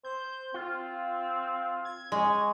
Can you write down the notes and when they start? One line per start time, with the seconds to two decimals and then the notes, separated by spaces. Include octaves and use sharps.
0.04 C5 G6
0.54 C4 F4
1.85 G#6
2.12 G#3 C#4